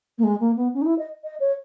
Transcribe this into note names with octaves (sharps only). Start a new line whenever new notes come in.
A#3
G#3
A#3
B3
C#4
D#4
E4
D#5
D#5
C#5